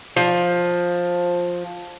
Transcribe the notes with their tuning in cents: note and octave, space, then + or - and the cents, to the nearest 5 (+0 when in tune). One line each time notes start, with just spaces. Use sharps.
F3 +10